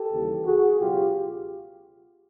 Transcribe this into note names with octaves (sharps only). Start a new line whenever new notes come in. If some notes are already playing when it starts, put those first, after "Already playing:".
Already playing: G4 A4
D#2 C#3 E3 G3 A#3
F#4 G#4
C#2 B2 F#3 F4 G4